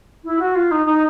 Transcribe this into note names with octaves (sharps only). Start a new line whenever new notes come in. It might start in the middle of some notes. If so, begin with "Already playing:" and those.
E4
F#4
F4
D#4
D#4